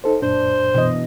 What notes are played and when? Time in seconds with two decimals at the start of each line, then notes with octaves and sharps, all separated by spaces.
0.04 D#4 A4 C5
0.22 F#2 A#2 D4 C5
0.74 B2 E3 D#5